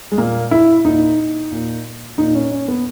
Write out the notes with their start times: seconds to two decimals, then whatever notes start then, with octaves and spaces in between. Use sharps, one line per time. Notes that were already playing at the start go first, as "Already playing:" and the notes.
0.12 G#3
0.18 A#2 A#3
0.51 E4
0.85 A#2 D#4
1.52 A#2
2.18 A#2 D#4
2.35 C#4
2.52 C#4
2.68 B3